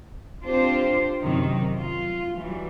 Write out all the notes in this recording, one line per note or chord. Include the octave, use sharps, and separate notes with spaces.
C4 D4 F4 G4 C5
F#2 C3 D#3
F4
E3 F#3 G3